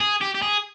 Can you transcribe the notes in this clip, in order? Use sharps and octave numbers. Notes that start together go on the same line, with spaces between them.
G#4
G4
G4
G#4